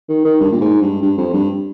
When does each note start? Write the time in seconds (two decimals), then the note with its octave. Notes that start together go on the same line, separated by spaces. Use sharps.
0.09 D#3
0.25 D#3
0.40 G2
0.52 A#2
0.61 G#2
0.81 G2
1.02 G2
1.17 F2
1.33 G2